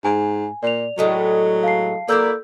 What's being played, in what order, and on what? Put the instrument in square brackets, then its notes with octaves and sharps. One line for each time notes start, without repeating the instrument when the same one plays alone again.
[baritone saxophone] G#2 [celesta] G#5
[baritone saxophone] A#2 [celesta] D5 F7
[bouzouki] A2 G#3 A3 [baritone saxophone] F#3
[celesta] F5 A5 C7
[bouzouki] F#3 E4 D5 [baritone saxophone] A#3 [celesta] A4 E6 G6